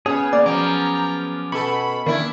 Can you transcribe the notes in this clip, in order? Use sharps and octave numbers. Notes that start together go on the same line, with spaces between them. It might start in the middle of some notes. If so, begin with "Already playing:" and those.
C#3 B3 C#4 G#4 C#5
A#3 D5
F3 F#3 A#5 D6
B2 A4 B5 C#6
D#3 A#3 D4 E4